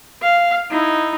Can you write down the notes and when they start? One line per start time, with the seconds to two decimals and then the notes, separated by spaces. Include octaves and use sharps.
0.22 F5
0.70 D#4 E4